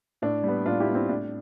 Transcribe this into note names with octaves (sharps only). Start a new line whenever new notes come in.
A2 D4
G3 B3
A2 D4 F4
E4 G4
G3 B3
C4 E4
A2 D4